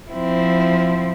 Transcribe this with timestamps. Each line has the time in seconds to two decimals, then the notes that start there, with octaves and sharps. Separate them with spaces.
0.12 F3 C4 E4